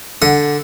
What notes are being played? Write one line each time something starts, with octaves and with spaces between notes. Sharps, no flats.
D3 F#5